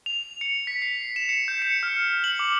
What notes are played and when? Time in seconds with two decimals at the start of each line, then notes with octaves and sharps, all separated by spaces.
0.06 F7
0.41 C#7
0.67 B6
0.82 C7
1.16 E7
1.29 C#7
1.48 G6
1.62 C#7
1.83 F6
2.24 F#7
2.39 D6